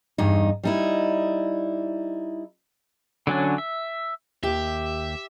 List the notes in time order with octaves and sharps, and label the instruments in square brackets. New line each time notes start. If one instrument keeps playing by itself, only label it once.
[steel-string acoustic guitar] E2 G2 D#4
G3 D#4 E4
[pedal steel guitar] D3 F#3 C#4 D4
E5
[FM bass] D#2 [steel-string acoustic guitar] G4 [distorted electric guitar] E5